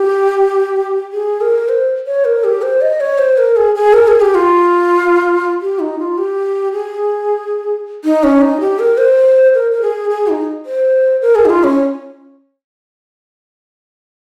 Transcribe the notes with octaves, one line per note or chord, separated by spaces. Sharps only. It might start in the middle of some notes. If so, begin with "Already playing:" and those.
Already playing: G4
G#4
A#4
C5
C#5
A#4
G4
C5
D#5
C#5
C5
A#4
G#4
G#4
A#4
G#4
G4
F4
G4
D#4
F4
G4
G#4
D#4
C#4
D#4
G4
A#4
C5
A#4
A#4
G#4
G#4
D#4
C5
A#4
G#4
D#4
F4
C#4